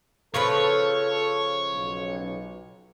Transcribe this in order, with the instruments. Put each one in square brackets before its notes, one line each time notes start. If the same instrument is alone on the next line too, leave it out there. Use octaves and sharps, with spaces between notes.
[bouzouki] C#3 F3 B4 [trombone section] A4 [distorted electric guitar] C#5
[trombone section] B1